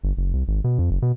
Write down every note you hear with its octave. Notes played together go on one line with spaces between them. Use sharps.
G1
F#1
C2
G#1
B2
F2
F#1
B2